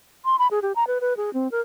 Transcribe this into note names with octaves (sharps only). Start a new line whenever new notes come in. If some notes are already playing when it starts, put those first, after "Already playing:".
C6
B5
G#4
G4
A#5
B4
B4
G#4
C4
A#4